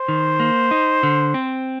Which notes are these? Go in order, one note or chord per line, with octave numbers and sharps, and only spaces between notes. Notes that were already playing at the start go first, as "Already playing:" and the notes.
Already playing: C5
D#3
A#3
D#4
D3
C4